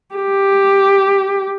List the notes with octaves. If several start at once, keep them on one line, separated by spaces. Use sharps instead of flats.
G4